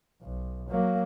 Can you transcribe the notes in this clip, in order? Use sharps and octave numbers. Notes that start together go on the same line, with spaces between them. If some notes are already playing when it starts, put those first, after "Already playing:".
B1
F#3 A#3